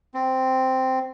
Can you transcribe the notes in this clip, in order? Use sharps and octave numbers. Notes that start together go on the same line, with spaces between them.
C4